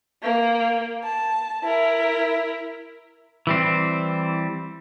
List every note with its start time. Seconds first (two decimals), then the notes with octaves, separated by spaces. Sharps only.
0.23 A#3
1.04 A5
1.64 E4 A#4
3.47 E3 G3 C4